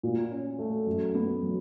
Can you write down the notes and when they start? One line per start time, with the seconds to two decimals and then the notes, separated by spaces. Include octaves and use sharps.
0.03 A#2
0.31 C#4
0.59 A3
0.86 F#2
1.15 B3
1.43 F#3